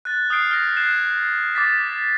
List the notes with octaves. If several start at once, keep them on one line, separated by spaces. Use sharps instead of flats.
F#6 A6
D#6 F6 G6 C7 D7
F6 A#6
F#6 G#6 C7 E7
D6 A6 B6